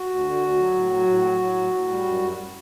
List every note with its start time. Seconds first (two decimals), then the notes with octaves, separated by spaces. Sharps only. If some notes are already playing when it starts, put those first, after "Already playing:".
Already playing: F#4
0.10 D2
0.25 D3
0.41 D2
0.58 F#3
0.74 A2
0.91 F#3
1.07 A2
1.23 F#3
1.39 F#3
1.56 A2
1.72 A2
1.89 G3
2.04 F#2
2.21 F#2